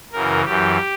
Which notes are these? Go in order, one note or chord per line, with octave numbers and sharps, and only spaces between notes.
F#2 C#3 E3 A#4
F#2 E3 G4